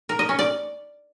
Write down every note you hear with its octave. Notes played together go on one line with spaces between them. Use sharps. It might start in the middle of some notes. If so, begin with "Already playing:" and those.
A#4
D#5
C#4
D5